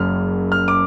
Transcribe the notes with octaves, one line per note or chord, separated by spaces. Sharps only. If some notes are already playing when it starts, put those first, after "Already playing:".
Already playing: F#1 F#2 C#3 F6
F6
D6